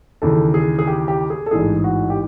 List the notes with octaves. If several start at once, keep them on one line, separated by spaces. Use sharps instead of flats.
D#2 C#3 E3 A4
G#4
G#4
G4
G4
G#4
A4
A1 G#2 E3 G#4
F#4
G4